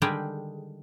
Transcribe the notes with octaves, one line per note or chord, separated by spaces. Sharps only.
D3 D#3 G3 G#3 G4 G#4